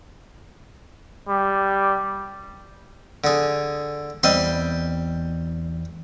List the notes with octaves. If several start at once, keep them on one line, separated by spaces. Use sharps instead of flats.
G3
D3 G#4
E2 G3 C4 D#5 C6